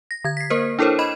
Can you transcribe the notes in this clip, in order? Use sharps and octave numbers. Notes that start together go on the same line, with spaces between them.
A#6
D3 G#6
B6 C7
A#3 A#4 C5
D4 E4 A4 A#4 C5 C#5
D#5 B5 E7